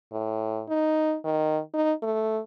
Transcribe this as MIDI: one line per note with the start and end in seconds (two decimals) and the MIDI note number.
0.12 0.63 45
0.69 1.16 63
1.24 1.59 51
1.74 1.93 63
2.02 2.40 57